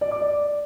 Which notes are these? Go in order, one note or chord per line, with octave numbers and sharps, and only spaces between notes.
D5
D6
D5